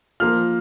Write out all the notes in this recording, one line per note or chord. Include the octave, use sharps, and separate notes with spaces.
F3 A#3 F4 F6